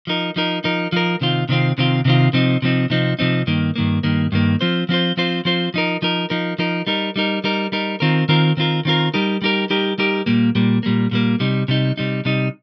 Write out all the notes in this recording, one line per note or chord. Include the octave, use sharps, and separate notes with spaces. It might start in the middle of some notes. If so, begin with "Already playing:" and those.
F3 D#4 A#4
F3 D#4 A#4
F3 D#4 A#4
F3 D#4 A#4
C3 D#3 C4 F4
C3 D#3 C4 F4
C3 D#3 C4 F4
C3 D#3 C4 F4
C3 F3 C4 D#4
C3 F3 C4 D#4
C3 F3 C4 D#4
C3 F3 C4 D#4
G2 D#3 A#3
G2 D#3 A#3
G2 D#3 A#3
G2 D#3 A#3
F3 C4 F4 C5
F3 C4 F4 C5
F3 C4 F4 C5
F3 C4 F4 C5
F3 D#4 A#4
F3 D#4 A#4
F3 D#4 A#4
F3 D#4 A#4
G3 D#4 A#4
G3 D#4 A#4
G3 D#4 A#4
G3 D#4 A#4
D#3 C4 F4 A#4
D#3 C4 F4 A#4
D#3 C4 F4 A#4
D#3 C4 F4 A#4
G3 D#4 G4 A#4
G3 D#4 G4 A#4
G3 D#4 G4 A#4
G3 D#4 G4 A#4
A#2 G3 A#3
A#2 G3 A#3
A#2 G3 A#3
A#2 G3 A#3
C3 G3 D#4
C3 G3 D#4
C3 G3 D#4
C3 G3 D#4